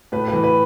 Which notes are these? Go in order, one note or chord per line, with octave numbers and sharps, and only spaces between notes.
A2 B4
B4
E3
B4